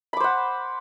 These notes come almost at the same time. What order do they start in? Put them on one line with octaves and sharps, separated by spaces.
B5 D6 C5 F#5